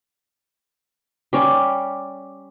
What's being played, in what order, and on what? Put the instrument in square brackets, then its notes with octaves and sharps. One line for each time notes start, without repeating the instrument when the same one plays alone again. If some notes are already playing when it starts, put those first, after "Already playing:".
[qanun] G3 C#4 G4